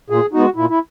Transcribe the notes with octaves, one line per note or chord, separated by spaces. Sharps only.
A#2 G#4
G#3 B3 D#4 F#4
A#2 E4
E4